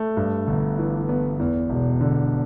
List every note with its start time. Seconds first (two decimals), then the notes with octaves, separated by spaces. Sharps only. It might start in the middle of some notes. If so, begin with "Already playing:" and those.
Already playing: A3
0.17 G2
0.47 G1
0.79 E3
1.09 B3
1.39 E2
1.70 E1
2.01 D3